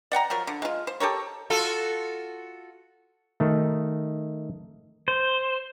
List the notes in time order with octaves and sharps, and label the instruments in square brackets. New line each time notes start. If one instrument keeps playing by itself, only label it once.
[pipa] D5 F#5 G5 A#5
F3 F#3 A#4
D3
G#3 F4
C5
G4 A4 A#4 C#5
[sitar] F4 F#4 A4
[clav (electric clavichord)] D#3 A3
[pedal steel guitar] C5